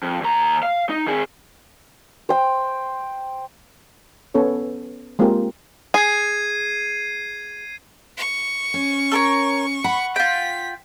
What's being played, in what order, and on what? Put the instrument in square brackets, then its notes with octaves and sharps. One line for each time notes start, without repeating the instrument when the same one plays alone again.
[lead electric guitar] F2
D#2 A#5
F5
D#4
D#3 G#4
[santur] C5 G5
[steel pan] B3 C#4 A4 C#5
G#3 A#3 C4 F4 G4 A#4
[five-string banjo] G#4 [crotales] G#6 C7 D#7
[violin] C#6
[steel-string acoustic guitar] C#4
[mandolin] A4 A#4 C#5
[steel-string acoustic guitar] F#5 [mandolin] B5
[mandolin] F4 G5 [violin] B6